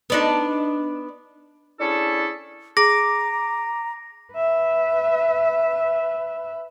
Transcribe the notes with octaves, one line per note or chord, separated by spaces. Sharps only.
B3 D4 D#4
C#4 D4 E4 G#4 A4
G#4 A#5 D6 A#6
B4 E5